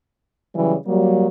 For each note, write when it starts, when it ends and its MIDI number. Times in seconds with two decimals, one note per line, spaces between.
0.55 0.75 49
0.55 0.75 52
0.55 0.75 54
0.55 0.75 55
0.87 1.28 54
0.87 1.28 55
0.87 1.28 58